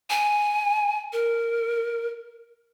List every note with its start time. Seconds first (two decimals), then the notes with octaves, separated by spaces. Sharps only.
0.10 G#5
1.13 A#4